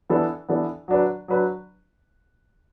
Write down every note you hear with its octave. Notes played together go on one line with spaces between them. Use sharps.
E3 B3 D4 A4
E3 B3 D4 A4
F#3 D4 B4
F#3 D4 B4